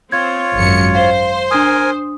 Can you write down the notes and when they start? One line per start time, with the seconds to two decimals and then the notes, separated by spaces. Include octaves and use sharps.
0.12 C4 F4 C#5 G#6
0.56 G#1 F#2 C#7
0.95 C5 F5
1.51 D4 A#4 G#5 D#6